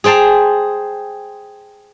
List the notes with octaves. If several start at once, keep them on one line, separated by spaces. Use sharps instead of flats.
G#4 C5 G5 A5 A#5